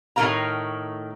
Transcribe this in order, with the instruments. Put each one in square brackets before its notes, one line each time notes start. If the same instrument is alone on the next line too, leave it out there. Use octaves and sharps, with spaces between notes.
[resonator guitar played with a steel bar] A2 D#3 A3 A#4 F5 A#5